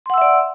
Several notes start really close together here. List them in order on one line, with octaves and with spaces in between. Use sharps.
C6 F#5 E6 E5 D5